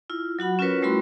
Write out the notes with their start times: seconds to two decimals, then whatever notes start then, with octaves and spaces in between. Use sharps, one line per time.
0.10 E4 F4
0.39 F#3 F#4 F#5 B5
0.59 C#4 F4 F#4 A#4 B4 C#5
0.82 G3 A3 E4 F#4 B5 C6